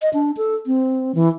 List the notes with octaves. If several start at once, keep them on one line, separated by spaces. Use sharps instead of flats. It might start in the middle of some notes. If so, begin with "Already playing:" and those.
D#5
D4
A4
C4
E3